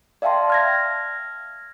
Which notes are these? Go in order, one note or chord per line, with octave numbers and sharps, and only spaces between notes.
D5 E5 F5 G5 A5 C6
F6 G#6 A#6